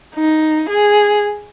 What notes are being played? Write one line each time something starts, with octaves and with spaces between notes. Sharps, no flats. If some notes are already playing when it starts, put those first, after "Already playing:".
D#4
G#4